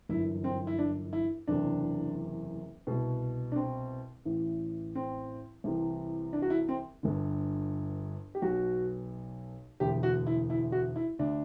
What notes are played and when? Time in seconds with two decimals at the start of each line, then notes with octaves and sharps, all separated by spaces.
0.09 G1 F#2 E3 E4
0.44 C4
0.67 E4
0.78 D4
1.13 E4
1.48 F#1 E2 C3 E3 D4
2.87 C2 B2
3.52 D4
3.56 C4
4.25 A1 A2 E3
4.95 C4
5.64 C2 C3 E3
6.33 D4
6.42 F#4
6.50 E4
6.69 C4
7.03 G1 G2 D3
8.35 G4
8.42 B1 B2 F#4
9.80 E1 D2 D3 G4
10.03 F#4
10.27 E4
10.50 E4
10.72 F#4
10.96 E4
11.19 D2 D3 D4